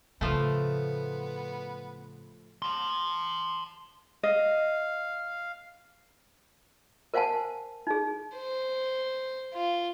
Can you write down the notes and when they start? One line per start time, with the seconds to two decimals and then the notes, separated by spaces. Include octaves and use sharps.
0.21 A2 C#3 F3 A3 B3
2.62 A5 C6
4.23 D#5 F5
7.14 A#4 C5 F5 F#5 G#5 A5
7.87 D#4 G#4
8.35 C5
9.53 F4